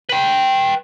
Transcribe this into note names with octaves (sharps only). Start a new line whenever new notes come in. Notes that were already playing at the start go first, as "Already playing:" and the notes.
B4 G5